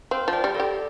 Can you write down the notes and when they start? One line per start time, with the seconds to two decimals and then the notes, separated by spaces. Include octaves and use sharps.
0.11 C4 C5 F5
0.28 F3
0.33 D5 G5
0.44 G3
0.55 G4 A4 D5